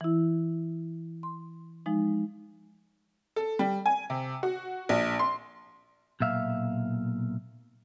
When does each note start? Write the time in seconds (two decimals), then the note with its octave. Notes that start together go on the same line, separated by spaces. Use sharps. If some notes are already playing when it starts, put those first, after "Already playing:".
0.01 E3 E4
1.23 C6
1.86 F3 G#3 D#4
3.36 A4
3.59 G3
3.86 G#5
4.10 C3
4.43 F#4
4.89 A#1
5.19 C6
6.20 B1 A#2 E5 F5